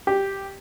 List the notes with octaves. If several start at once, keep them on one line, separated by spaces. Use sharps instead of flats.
G4